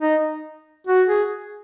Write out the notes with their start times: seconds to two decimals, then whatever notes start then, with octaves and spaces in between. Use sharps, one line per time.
0.01 D#4
0.87 F#4
1.08 G#4